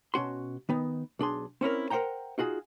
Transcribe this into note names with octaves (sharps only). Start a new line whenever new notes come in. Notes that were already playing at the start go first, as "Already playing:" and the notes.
B2 C#4 F#4 C6
D#3 B3 D#4
B1 D4 G#4 C6
C4 C#4 E4 A#4
A#4 C5 F#5 G5 A#5
D#4 F4 F#4 G#4